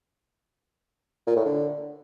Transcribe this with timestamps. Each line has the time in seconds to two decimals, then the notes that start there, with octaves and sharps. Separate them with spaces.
1.27 A#2
1.36 A2
1.45 D3